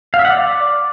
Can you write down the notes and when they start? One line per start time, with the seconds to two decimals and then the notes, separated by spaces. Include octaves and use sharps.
0.14 F5
0.19 E5
0.25 F#5
0.30 D5